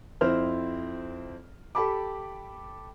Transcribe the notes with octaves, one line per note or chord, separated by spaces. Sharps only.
F2 C4 E4 C5 F6
G4 A4 A5 B5 D6